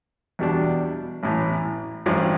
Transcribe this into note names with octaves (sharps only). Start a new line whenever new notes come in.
E2 B2 G3 D4
A1 A2 E3
A1 G2 F3